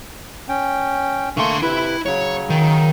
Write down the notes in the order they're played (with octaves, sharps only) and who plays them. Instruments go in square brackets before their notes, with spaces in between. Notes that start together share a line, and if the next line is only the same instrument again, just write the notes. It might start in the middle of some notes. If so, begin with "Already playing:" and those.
[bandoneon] C#4 G5
[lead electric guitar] D3 C6 [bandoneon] A3 A#3 C#6
[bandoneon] C3 B4 [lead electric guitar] E4
[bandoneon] C#3 F#3 [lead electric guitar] C#5
[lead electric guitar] D#3